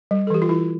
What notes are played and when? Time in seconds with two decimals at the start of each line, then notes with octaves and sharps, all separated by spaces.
0.11 G3
0.27 A4
0.30 E3 G4
0.42 F4
0.49 E3 E4